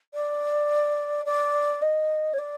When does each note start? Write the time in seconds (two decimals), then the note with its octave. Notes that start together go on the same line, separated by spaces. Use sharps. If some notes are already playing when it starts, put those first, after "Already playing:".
0.14 D5
1.25 D5
1.82 D#5
2.33 C#5
2.38 D5